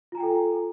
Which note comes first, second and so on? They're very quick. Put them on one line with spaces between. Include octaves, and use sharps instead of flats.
F4 A#5 G#5 G5 A4